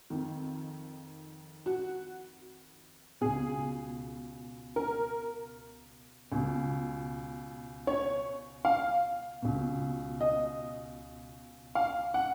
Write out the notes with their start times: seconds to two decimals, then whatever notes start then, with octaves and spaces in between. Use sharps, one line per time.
0.10 F2 D#3
1.66 F#4
3.21 C#2 B2 G#4
4.76 A#4
6.32 C#2 B2
7.87 C#5
8.65 F5
9.42 C#2 B2
10.21 D#5
11.75 F5
12.14 F#5